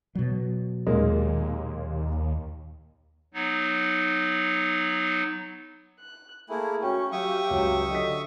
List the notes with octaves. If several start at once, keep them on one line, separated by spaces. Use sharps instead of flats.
B2 F#3
D#2 A#2 G#3 A#3
F#3 B3 D#4
F#6
A3 A#3 E4 G#4
C#4 F#4 G5 C#6
F#3 G4 E5 F5 C#6 D#6
C#2 F#3
D3 D#5 B6